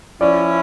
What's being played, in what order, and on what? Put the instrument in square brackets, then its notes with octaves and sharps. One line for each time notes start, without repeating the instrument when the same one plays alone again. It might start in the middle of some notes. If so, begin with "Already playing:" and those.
[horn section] F3 C#4 E4 [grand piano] D5